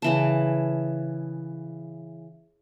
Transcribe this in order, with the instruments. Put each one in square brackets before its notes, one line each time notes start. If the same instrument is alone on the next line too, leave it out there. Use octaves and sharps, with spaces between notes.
[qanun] C#3 E3 A5